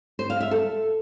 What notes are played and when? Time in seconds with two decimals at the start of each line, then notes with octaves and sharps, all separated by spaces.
0.19 C5
0.30 F5
0.40 E5
0.51 A4